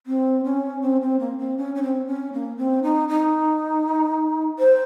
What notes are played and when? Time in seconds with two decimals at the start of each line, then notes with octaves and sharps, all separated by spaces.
0.06 C4
0.44 C#4
0.82 C4
1.01 C4
1.19 A#3
1.38 C4
1.58 C#4
1.75 C#4
1.83 C4
2.07 C#4
2.33 A#3
2.57 C4
2.83 D#4
3.08 D#4
4.59 C5